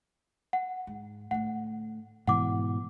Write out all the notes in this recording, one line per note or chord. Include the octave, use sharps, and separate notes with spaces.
F#5
G#2
A2 D3 F#5
G#2 B2 D3 E3 C4 F#5 D6